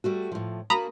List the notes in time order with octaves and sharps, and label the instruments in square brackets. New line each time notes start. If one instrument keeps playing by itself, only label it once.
[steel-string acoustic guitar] G3 A3 F#4
A2 F3
[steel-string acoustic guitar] A#3 D4 F#4 [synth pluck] A#5 B5 D#6